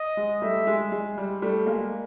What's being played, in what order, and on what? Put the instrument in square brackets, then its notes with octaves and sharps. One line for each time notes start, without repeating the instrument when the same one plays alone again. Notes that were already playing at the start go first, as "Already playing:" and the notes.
Already playing: [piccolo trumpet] D#5
[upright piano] G#3
[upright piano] G3 A3 [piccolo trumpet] E5
[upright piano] G#3
G#3
G3
G3 A3
G#3 A#3